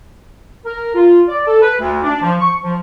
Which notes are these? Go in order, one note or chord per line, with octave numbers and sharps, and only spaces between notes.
A#4
F4
D5
A4
B4
D2
D4
F3
C#6
F3